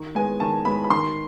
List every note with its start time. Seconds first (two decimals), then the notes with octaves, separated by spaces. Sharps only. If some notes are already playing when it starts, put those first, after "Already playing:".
Already playing: D#3
0.15 G#3 B3 G#5
0.40 D#3 A5
0.65 G#3 B3 B5
0.84 B5
0.90 D#3 C6